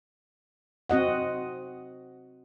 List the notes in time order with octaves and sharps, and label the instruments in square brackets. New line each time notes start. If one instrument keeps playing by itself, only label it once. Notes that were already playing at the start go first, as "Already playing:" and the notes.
[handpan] C4 F#4 D#5 F#5